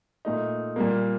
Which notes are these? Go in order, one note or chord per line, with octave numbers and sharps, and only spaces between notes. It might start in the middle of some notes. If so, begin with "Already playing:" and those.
A#2 A3 D#4
A#2 G3 A#3